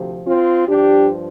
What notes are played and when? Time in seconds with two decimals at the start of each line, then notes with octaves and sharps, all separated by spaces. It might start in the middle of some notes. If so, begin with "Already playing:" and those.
Already playing: D2 C3 F3
0.27 C4 F4
0.67 G2 F3 D4 G4